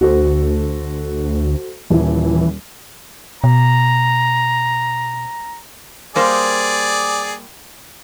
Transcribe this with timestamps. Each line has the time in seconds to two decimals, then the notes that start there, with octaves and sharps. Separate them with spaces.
0.01 D2 F#4 A4 C5
1.90 D#1 E3 E4
3.44 B2 A#5
6.16 G3 A#3 G#4 C5 D5